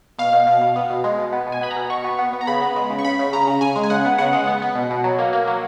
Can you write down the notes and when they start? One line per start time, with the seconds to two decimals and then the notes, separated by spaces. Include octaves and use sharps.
0.18 B2 F5
0.33 B2
0.47 B2
0.62 B2
0.76 B3
0.90 B2
1.04 G#3
1.18 B2
1.33 B3
1.47 B2
1.52 G#5
1.61 B3 B5
1.71 A#5
1.76 B2
1.90 B2 C#6
2.04 B3
2.19 B3
2.33 B3
2.41 A#5
2.47 C#3 B5
2.61 B3
2.76 G#3
2.90 C#3
2.99 C#6
3.04 C#3 B5
3.19 C#3
3.33 C#3 A#5
3.47 C#3
3.61 C#3 G#5
3.76 G#3
3.83 G#5
3.90 C#3 F#5
4.05 B3
4.18 C#3 F#5
4.33 G#3
4.47 B3
4.62 B3
4.75 B2
4.90 B2
5.04 F#3
5.19 A#3
5.33 A#3
5.47 F#3